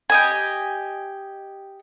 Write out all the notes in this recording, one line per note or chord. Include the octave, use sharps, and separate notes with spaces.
G4 D#5 G#5